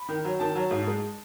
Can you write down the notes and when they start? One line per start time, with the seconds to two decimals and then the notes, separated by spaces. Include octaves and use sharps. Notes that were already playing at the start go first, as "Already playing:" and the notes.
Already playing: B5
0.09 D#3
0.25 F#3
0.40 D#3 A5
0.55 F#3
0.71 G#2
0.87 G#3